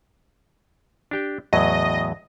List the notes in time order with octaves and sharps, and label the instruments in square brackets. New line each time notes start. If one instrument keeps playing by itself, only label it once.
[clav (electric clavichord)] D4 G4 G5
[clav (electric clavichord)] E2 A2 F#3 [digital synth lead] D#5